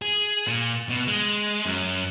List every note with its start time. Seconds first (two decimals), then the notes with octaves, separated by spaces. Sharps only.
0.02 G#4
0.47 A#2
0.89 B2
1.08 G#3
1.66 F#2